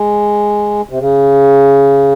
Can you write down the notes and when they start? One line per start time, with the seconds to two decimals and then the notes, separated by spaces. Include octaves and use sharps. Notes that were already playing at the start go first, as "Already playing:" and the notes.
Already playing: G#3
0.89 C3
1.00 C#3